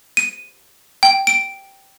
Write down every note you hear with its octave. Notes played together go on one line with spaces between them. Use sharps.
D#7
G5
D7